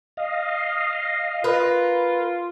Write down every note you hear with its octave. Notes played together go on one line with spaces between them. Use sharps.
D#5 F5
F4 A#4 B4